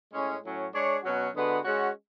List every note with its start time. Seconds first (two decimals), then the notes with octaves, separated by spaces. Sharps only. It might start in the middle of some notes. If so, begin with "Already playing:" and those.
0.12 A2 G#3 C#4
0.43 A2 F#3 C#4
0.74 G#3 D4 G#4 C#5
1.04 B2 F#3 C#4 F#4
1.35 D3 G#3 B3 F#4 B4
1.64 G#3 C#4 F#4